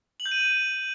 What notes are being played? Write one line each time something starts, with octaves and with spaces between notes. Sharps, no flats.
F#7
G6
D#7